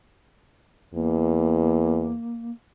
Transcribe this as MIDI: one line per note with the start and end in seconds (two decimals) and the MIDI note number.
0.94 2.14 40
0.94 2.51 58